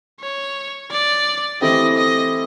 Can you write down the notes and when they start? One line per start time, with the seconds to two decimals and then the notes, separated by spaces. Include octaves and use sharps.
0.20 C#5
0.91 D5
1.61 E3 A3 C4 E4 G4 D#5
1.97 D#5